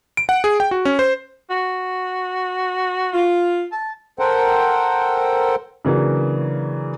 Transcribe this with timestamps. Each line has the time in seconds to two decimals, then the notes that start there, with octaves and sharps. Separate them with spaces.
0.17 D7
0.29 F#5
0.44 G#4
0.60 G5
0.71 F#4
0.85 C#4
0.99 C5
1.50 F#4
3.13 F4
3.72 A5
4.19 A4 A#4 C5 F#5 G5
5.85 C#3 E3 F#3 A#3 D4